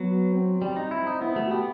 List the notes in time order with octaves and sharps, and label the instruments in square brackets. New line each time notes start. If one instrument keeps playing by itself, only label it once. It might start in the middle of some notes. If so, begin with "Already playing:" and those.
Already playing: [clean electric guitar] F#3 [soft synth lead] B3
[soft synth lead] C4
[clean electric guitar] G3 [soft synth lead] C4
[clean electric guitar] D#4
E4
D#4
[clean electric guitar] B3 [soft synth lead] E4
[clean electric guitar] A3 [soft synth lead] F#4
[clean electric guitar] B3 [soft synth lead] G4